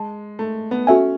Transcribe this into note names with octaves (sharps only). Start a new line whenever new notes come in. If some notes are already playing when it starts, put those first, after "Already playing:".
Already playing: G#3 A5
A3
B3
C#4 F#4 A4 E5 G#5